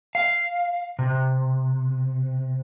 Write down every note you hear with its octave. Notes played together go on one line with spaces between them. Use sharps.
F5
C3